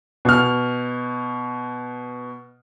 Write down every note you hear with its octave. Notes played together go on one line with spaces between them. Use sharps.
B2 F6